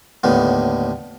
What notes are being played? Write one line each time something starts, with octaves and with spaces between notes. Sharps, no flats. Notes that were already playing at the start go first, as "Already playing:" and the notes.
D#2 A2 D3 B3